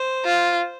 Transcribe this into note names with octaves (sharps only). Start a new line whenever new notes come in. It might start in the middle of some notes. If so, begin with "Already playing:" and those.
Already playing: C5
F4